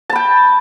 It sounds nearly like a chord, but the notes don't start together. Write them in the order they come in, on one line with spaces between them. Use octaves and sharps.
A5 B5 G5